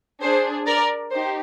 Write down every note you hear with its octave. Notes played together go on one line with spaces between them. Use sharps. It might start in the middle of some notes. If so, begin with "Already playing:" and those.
D4 G#4 C5
A#4 D5
D#4 G4 C5